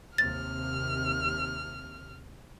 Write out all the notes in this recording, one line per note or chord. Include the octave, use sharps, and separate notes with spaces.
D#2 C3 F6 A6